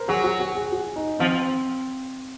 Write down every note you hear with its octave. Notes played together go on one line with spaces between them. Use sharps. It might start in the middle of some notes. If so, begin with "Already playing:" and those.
Already playing: A#4 C5
F#3 G#4
F#4
F#4
G#4
F#4
D#4
F3 C4